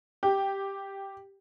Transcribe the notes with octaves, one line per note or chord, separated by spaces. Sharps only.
G4